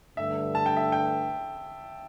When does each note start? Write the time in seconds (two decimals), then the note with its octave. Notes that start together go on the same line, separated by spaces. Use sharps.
0.17 G2 D3 A3 E5
0.55 A5
0.66 G5
0.77 E5
0.92 G5